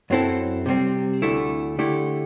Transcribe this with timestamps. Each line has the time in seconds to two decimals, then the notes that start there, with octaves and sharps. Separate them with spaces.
0.10 F#2 F#3 C4 E4 A4
0.66 C3 G3 C4
1.22 D2 D3 A3 E4
1.79 D3 A3 E4 G4